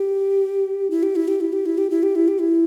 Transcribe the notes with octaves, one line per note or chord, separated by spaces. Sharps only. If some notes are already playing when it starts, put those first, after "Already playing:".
Already playing: G4
E4
G4
E4
G4
E4
G4
E4
G4
E4
G4
E4
G4
E4